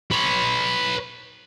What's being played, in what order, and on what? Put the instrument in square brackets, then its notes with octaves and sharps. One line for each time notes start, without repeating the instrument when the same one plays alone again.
[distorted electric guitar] B4 C#5